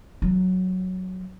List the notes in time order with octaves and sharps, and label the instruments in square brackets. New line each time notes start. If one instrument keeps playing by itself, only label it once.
[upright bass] F#3